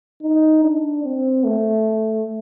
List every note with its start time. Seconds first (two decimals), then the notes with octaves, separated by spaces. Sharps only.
0.22 D#4
0.63 D4
1.04 C4
1.44 A3